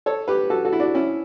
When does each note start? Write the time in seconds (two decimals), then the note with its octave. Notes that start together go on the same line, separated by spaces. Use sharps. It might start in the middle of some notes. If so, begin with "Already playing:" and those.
0.06 A4 C#5
0.28 G4 B4
0.50 F#4 A4
0.65 F#4 A4
0.72 E4
0.80 D4 F#4
0.95 C#4 E4